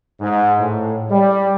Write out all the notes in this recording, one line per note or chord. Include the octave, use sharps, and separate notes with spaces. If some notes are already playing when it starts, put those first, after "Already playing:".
G#2
A2
G3